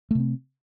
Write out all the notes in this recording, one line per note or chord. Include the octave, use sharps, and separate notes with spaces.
C3 A3 C4